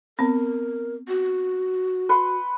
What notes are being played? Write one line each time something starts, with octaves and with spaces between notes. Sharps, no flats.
B3 C4 A#4
F#4
B4 F#5 C6